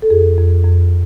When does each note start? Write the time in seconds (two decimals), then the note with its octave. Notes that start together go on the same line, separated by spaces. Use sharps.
0.02 A4
0.10 F2 G#4
0.38 F2
0.65 F2